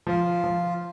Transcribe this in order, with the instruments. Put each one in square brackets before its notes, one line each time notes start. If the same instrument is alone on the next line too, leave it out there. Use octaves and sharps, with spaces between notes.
[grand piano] F3 [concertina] F4
[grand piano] F3